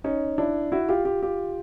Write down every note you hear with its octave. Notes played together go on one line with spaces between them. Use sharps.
C#4 D#4
D4 E4
E4 F#4
F4 G4
F4 G4
F4 G4